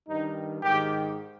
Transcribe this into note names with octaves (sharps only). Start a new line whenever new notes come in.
G2 D#3 D#4
G#2 D#3 G4